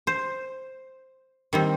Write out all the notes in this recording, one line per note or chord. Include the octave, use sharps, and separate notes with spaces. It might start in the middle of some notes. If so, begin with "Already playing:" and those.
C5
D#3 G3 C4